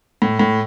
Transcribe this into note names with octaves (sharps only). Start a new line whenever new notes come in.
A2
A2